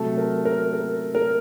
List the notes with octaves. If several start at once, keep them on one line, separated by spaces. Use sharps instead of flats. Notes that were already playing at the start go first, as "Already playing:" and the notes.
Already playing: C3 F#3 A3 A4
A#4
A#4
A#4
A#4